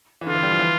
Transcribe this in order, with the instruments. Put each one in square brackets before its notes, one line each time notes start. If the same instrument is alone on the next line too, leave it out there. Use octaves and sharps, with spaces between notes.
[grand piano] E3
[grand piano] D3 [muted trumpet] F4
[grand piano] E3
G3
F3
E3